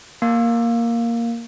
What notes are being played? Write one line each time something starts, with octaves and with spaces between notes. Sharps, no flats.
A#3